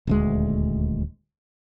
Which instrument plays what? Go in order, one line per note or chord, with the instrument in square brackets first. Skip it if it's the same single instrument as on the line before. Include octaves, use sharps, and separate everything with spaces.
[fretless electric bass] D#1 D2 G#3